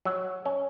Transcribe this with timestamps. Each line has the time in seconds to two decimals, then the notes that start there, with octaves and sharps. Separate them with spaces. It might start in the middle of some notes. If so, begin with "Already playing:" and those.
0.05 F#3
0.46 C#4